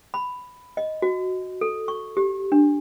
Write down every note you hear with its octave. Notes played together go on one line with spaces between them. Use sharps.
B5
D#5
F#4
A4
C#6
G4
D4